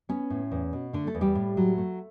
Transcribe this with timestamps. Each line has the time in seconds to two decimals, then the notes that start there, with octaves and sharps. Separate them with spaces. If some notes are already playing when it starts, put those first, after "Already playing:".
0.09 B3 C#4
0.30 A2
0.51 E2
0.73 B2
0.93 D3 A3 D4
1.07 A3 A4
1.15 E2
1.21 G3 G4
1.35 A2
1.57 F#3
1.78 A3